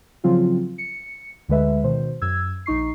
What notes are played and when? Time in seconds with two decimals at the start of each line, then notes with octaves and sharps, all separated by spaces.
0.24 C#3 F3 F#3 C4 F4
0.78 C#7
1.48 D2 D3 G#3 B4 E5
1.83 B2 D#3 C5
2.22 F#2 E6 G#6
2.66 A#1 D#4 C#6 C7